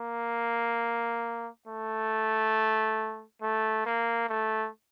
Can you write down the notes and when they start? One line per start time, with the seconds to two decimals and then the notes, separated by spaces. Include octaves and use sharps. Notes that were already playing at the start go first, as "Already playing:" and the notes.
Already playing: A#3
1.67 A3
3.42 A3
3.86 A#3
4.29 A3